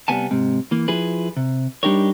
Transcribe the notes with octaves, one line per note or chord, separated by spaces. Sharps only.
C2 E3 G3 B3 G#5 A5
G#2 C3
E3 A#3
F3 E4 G#4 B4
C3
G3 D4 D#4 G4 A#4 C#5